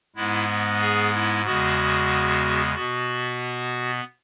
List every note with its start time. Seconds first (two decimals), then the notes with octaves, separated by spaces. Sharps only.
0.16 G#2 G#3 B3 E4
0.81 G#4
1.13 E4
1.45 E2 C#3 G#3 B3 F#4
2.75 B2 B3 F#4